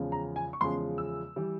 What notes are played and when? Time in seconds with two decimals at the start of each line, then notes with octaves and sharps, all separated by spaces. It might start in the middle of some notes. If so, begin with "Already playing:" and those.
Already playing: E2 C#3 F3 G#3
0.12 A#5
0.36 G#5
0.53 C#6
0.61 E2 C#3 F3 G#3 C6
0.98 E6
1.36 E3 G3